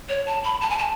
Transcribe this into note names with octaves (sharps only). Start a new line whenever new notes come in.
C#5
A5
B5
A5
G#5
A5